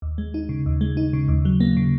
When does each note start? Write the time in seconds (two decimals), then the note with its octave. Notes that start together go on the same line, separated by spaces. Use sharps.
0.02 D#2
0.18 G#3
0.34 D#4
0.49 C#3
0.66 D#2
0.81 G#3
0.97 D#4
1.13 C#3
1.28 D#2
1.45 F#3
1.60 A#3
1.77 C#3